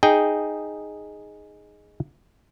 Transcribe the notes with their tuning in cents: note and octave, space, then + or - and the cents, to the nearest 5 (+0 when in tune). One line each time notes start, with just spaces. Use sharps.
D#4 -5 G#4 +0 G5 +0